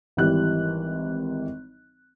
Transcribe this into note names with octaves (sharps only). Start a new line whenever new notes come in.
G#1 E3 G3 F#6